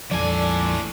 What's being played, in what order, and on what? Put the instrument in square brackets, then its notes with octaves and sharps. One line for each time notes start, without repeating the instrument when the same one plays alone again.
[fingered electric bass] A#1 F2 F3 [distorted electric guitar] A2 G#5 [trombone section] D4 A4 [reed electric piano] D5